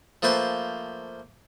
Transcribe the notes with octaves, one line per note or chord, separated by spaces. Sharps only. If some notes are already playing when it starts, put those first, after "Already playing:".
F3 A3 A#3 B4 C5 C6